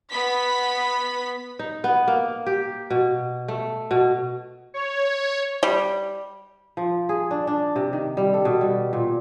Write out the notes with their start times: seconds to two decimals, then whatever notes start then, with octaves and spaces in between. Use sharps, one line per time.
0.11 B3 B5 B6
1.59 D#4
1.84 B3
2.08 A#3
2.46 G4
2.90 B2
3.48 A3
3.91 B2
4.74 C#5
5.63 G3
6.77 F3
7.09 G#4
7.31 D4
7.47 D4
7.76 C3
7.93 D#3
8.17 G3
8.34 A4
8.45 B2
8.61 G3
8.93 A#2